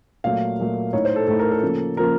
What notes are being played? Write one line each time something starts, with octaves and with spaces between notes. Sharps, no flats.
A#2 F#3 A3 F5
A#2 F#3 A3
A2 A3 D#4 C#5
C5
A4
A2 A3 D#4 A4
A#4
A4
C#3 F3 A#3
C#3 F3 A#3 A#4